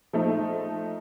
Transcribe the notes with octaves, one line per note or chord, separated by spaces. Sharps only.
F3 A3 D#4